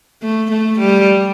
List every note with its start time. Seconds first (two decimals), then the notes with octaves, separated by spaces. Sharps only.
0.22 A3
0.51 A3
0.79 G3